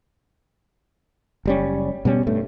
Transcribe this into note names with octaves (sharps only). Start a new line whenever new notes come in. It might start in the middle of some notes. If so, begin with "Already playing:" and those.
F#1 G3 C#4
B2 G3 A#3 C#4
G2 A3